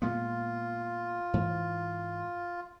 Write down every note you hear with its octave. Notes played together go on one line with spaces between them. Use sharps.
A#2 G#3 B3 F4
G#2 E3